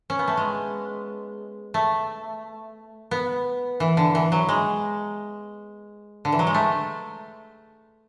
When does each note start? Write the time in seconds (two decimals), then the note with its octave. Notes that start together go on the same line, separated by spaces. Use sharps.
0.10 C#4
0.19 B3
0.28 A3
0.37 G#3
1.74 A3
3.11 B3
3.80 E3
3.97 D3
4.15 E3
4.32 F#3
4.49 G#3
6.25 D3
6.32 E3
6.39 F#3
6.47 G#3
6.54 A3